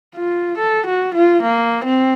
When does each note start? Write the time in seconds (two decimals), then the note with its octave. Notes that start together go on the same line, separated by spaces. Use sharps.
0.15 F4
0.58 A4
0.86 F#4
1.14 F4
1.42 A#3
1.84 C4